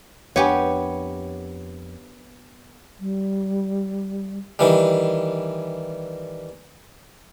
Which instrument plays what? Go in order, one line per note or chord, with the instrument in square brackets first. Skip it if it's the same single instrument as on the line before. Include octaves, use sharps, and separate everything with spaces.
[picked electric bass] F2 D4 [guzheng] B3 G4 [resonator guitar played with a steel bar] C#5 G#5
[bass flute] G3
[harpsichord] D#3 E3 G3